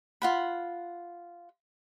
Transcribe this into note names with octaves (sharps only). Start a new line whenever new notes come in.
F4 F#5 B5